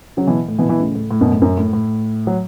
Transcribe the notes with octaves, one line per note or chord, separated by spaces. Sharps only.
C#3 F#3
B2 E3
A2
B2 E3
B2 E3
A2 C#3
A2
A2
F#2 B2
A2
F#2
A2
A2
F#3